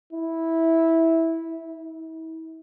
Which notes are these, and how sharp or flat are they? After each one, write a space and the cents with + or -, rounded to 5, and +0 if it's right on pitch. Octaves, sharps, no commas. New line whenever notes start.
E4 -10
E4 -40